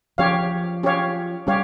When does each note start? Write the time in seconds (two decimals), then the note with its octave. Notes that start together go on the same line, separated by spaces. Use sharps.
0.18 F3 C#4 G4 C#5 F5
0.83 C#4 G4 C#5 F5
1.47 G3 C#4 G4 C#5 F5